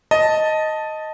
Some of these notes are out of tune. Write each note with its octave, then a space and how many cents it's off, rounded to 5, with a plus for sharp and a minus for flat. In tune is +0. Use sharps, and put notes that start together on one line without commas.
D#5 +5 A5 +0